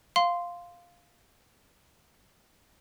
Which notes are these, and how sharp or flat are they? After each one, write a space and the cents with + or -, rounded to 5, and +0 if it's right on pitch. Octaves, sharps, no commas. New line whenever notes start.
F5 +0 C6 -5